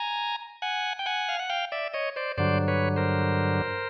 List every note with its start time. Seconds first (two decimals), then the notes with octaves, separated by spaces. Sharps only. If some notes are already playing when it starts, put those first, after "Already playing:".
Already playing: G#5 A#5
0.62 F#5 G#5
0.99 G5
1.06 F#5 G#5
1.29 F5
1.39 F#5
1.50 F5 G5
1.72 D5 E5
1.94 C#5 D#5
2.16 C5 D5
2.38 G2 D3 F#3 C5 D5
2.68 B4 C#5
2.96 A#4 C5